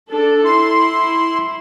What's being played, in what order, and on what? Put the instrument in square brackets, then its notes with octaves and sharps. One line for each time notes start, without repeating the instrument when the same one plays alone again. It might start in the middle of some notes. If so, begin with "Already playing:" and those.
[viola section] D4 A4
[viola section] E4 [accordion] C6